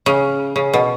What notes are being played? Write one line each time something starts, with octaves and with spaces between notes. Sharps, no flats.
C#3
C#3
B2